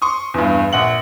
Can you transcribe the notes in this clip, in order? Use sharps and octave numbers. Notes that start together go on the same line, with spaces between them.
C6 C#6 D#6
E2 G2
A#1 F#5 F#7